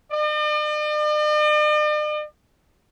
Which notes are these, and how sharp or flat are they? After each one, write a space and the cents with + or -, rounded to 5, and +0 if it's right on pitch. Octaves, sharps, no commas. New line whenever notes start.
D5 +45